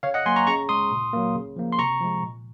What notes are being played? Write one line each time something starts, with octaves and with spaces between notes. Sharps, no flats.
C#3 C#5 F5
D#5 F#5
F#3 A#3 G#5 C6
A#5 C#6
C#3 A#5 C#6
G#3 C6 D#6
A#2
F#3 A#3
C#3
F3 A#3
C6
C3 A#5 C#6
F3 G#3
A#2